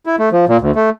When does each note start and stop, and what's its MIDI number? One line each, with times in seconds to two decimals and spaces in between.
0.06 0.16 64
0.19 0.29 57
0.32 0.45 53
0.48 0.57 46
0.61 0.71 38
0.75 0.90 57